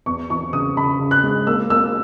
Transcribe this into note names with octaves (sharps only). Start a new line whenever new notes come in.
E2 C#6
E3 C#6
C#3 D#6
C#3 B5
C#3
F#6
G#3
A#3 E6
A#3 E6